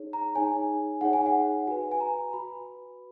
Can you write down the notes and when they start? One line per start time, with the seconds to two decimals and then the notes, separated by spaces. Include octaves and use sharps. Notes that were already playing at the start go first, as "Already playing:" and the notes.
Already playing: D#4 G#4 C#5
0.13 A#5
0.35 D#4 G#4 C#5 G#5
1.01 D#4 G#4 C#5 F#5
1.13 G#5
1.26 F#5
1.67 F#4 B4 G#5
1.92 G#5
2.00 A#5
2.33 F#4 B4 B5